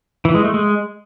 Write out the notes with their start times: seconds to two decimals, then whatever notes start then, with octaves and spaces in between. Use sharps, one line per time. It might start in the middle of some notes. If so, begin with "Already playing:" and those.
0.25 E3
0.35 G#3
0.44 A3
0.54 G#3